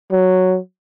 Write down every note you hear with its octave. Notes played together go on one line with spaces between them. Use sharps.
F#3